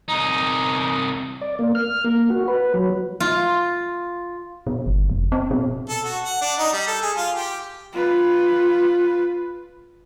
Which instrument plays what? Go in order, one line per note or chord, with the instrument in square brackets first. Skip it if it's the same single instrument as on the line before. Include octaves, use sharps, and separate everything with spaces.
[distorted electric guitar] C2 D#4
[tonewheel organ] D5
A#3
F6
A#3
F#4
B4
F#3
[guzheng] F4
[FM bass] B2
G1
F1
C4
B2
[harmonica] A4
F#4
F#5
D4
D#4
G3
A4
G#4
F4
G4
[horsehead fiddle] F4 B4